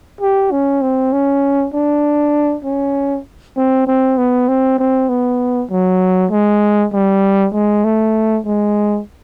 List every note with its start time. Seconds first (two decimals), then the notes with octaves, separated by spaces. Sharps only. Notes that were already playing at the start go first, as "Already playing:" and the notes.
0.21 G4
0.52 C#4
0.82 C4
1.13 C#4
1.74 D4
2.65 C#4
3.57 C4
3.87 C4
4.18 B3
4.48 C4
4.79 C4
5.09 B3
5.71 F#3
6.31 G#3
6.93 G3
7.54 G#3
7.84 A3
8.46 G#3